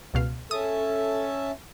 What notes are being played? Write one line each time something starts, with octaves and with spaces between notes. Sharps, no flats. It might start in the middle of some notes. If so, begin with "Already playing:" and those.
C#2 B2 F5
C#4 A4 E5 A5 D#6